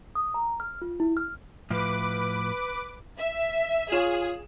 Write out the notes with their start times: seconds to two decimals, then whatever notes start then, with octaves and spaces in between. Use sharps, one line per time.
0.15 D#6
0.34 A#5
0.60 F6
0.82 F4
1.00 E4
1.17 F6
1.70 A2 F3 B4 D6
3.17 E5
3.92 F4 G#4 C#5 E7